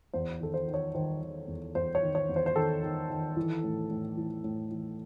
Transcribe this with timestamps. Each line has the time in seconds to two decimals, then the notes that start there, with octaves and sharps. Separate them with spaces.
0.14 E2 C5
0.40 D#3 A4
0.54 C5
0.67 D#3
0.74 C#5
0.95 D#3 C5
1.21 D#3
1.48 E2
1.75 E2 C5
1.95 C#5
2.03 D#3
2.15 C#5
2.29 E2
2.36 C5
2.46 C5
2.55 D#3 A4
2.83 D#3
3.10 D#3
3.37 E3
3.63 A2
3.90 A2
4.17 E3
4.44 A2
4.71 E3